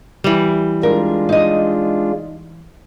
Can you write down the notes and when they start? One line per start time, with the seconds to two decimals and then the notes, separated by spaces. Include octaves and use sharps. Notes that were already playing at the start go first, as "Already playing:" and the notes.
0.24 E3 G3
0.83 G#3 D4 F4 A#4
1.29 D#4 D#5